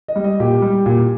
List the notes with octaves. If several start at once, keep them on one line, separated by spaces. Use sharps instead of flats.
D#5
G3
D#5
A#2 G4
G3
A#2